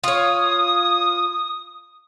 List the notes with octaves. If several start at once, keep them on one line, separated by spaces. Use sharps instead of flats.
F4 C#5 D#6